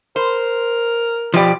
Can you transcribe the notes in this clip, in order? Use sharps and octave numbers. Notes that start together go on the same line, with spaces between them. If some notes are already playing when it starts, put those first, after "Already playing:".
A#4 C5
B2 F3 G4 D5